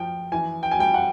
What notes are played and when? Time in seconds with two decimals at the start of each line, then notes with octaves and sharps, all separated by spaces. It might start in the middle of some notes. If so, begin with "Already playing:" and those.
Already playing: F3 G5
0.32 E3 G#5
0.63 G5
0.71 G#5
0.79 G3 G5
0.94 F#5